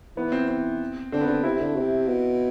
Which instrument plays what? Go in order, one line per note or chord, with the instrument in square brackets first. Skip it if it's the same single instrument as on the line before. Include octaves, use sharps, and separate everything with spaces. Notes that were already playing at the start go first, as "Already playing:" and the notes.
[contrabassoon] E3 [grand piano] B3
[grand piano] C4
C4
[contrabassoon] D3 [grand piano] C4
[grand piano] B3
[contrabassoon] D3 [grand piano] C4
[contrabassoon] C3 [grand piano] C4 E4
[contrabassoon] D3
C3
B2